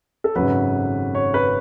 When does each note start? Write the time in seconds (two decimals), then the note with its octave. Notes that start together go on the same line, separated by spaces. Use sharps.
0.24 A4
0.36 G#1 F#2 C#3 F#3 B4
1.15 C#5
1.34 B4